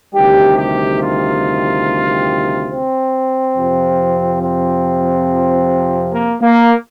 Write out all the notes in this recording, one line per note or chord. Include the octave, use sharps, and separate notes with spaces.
D2 C3 D#3 G3 G4
G4
F4
C4
F2 C3 F3
C4
A#3
A#3